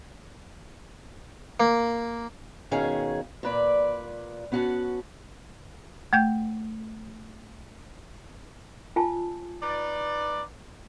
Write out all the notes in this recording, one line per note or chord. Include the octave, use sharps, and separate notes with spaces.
A#3
B2 D#3 C#4 G#4 F5
A#2 B4 D5
B3 C#4 F#4 F#5 A5
A3 G5 G6
F4 G#5 A5
D#4 B4 D5